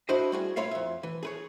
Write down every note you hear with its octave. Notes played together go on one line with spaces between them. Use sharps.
D4 E4 F#4 C5 D#5
G3 F#4 G#4
E4 F4 C#5 E5 F5
F2 E5
E3
G#4 B4 C#5